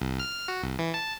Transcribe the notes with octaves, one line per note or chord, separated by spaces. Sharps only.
C2
F6
F#4
C2
E3
A5